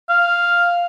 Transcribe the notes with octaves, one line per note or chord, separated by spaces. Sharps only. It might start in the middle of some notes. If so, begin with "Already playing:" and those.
F5